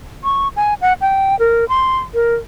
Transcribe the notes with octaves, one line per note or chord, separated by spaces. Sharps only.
C#6
G#5
F#5
G5
A#4
C6
A#4